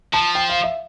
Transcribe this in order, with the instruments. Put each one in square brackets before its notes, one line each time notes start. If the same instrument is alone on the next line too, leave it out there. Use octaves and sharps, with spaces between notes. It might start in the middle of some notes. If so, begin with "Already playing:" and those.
[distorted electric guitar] F3 [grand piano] A5
[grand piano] G5
F5
E5